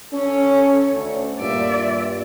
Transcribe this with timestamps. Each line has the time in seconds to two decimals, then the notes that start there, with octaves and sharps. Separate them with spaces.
0.13 C#4 A4 C#5
0.93 D2
1.39 G2 A#2 D5 E5